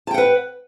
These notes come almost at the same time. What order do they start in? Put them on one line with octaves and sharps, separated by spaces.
A5 G5 F#5 B4